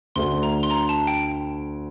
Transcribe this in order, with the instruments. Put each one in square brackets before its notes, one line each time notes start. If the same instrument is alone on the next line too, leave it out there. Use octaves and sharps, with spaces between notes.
[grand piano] D2 D3 A3 D4 [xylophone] C6
[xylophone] A#5
C6
A#5
A5
G5